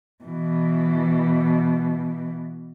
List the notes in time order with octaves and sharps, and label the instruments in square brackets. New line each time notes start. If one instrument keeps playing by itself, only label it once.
[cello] B2 E3